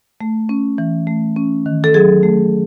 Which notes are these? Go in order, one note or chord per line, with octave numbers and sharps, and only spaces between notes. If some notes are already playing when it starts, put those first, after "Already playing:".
A3
C#4
E3
A3
C#4
D#3
A4
F#3 G#4
A3